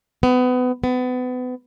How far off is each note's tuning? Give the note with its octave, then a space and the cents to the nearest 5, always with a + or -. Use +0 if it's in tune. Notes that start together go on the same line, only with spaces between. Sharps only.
B3 +25
B3 +30